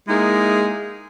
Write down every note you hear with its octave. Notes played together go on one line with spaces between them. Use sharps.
G#3 A#3 D#4 E4 G#4